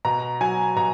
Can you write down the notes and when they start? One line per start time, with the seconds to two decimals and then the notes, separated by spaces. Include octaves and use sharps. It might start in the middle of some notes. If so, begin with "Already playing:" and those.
0.05 B2 A#5
0.41 F#3 G#5
0.76 B2 A#5